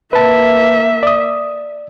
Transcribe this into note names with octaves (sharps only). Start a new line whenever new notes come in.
A#3 B4 E5 A5
D5 D#6